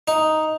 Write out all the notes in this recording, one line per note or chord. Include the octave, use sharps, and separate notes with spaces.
D#4